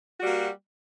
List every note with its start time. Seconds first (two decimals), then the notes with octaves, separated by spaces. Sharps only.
0.18 F#4
0.22 G3
0.25 A#3